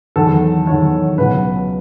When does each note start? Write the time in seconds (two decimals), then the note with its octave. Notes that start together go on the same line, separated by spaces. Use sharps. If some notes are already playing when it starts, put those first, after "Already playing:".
0.16 E2 D#3 F#3 A4
0.67 E2 D#3 F#3 C#5
1.18 C#2 B2 F#3 B4